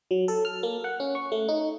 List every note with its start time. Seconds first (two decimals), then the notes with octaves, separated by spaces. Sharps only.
0.11 F#3
0.28 A4
0.45 F6
0.63 A#3
0.84 F#5
1.00 C#4
1.15 C#6
1.32 A3
1.48 D#4